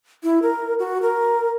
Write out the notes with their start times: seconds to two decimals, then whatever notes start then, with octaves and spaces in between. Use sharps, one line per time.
0.24 E4
0.42 A#4
0.79 F#4
1.02 A#4